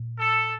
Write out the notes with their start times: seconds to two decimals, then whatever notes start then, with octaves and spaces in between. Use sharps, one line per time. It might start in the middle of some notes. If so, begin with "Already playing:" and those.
Already playing: A#2
0.18 A4